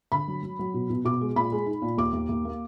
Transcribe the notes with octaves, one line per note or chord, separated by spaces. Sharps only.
D3 B5
F#3
F#3
F#3
B2
B2
B2 D6
G#3
A#2 B5
G#3
D#4
A#2
D#2 D6
D#2
D#2
A#3